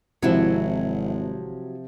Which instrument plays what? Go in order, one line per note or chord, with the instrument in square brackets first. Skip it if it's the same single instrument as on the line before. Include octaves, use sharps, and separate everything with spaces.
[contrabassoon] G#1 [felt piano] C3 F3 [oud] F#3 E4